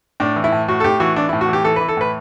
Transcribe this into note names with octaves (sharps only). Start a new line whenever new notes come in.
A2 D4
E3
E4
A2
A2 F#4
A4
A2 G4
E3 F#4
E3 D4
E4
A2
F#4
E3 G4
E3 A4
B4
E3
A4
A2 B4